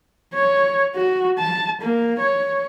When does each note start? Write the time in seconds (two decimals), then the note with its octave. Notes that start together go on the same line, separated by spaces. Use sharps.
0.34 C#5
0.95 F#4
1.39 A5
1.81 A#3
2.19 C#5